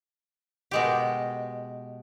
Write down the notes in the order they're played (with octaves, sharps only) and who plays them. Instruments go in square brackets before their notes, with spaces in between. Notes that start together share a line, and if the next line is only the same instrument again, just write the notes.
[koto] B2 G#3 G4